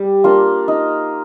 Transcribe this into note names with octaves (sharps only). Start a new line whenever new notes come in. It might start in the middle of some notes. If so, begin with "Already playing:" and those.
Already playing: G3
A#3 D4 F4
D#4